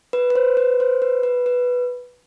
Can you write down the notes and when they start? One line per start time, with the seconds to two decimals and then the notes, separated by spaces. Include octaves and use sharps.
0.13 B4
0.30 B4
0.35 C5
0.57 B4
0.80 C5
1.02 B4
1.23 B4
1.46 B4